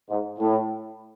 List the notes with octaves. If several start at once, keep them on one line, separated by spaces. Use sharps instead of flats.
G#2
A2